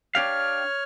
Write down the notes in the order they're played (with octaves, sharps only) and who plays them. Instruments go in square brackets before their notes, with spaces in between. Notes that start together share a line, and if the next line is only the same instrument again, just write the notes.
[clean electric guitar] D4 G4 F5 [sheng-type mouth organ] C#5 F6